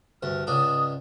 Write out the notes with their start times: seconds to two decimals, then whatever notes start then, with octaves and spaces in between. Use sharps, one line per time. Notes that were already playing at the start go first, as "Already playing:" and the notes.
0.23 D2 G2 F6
0.47 C#2 G#2 D4 D#6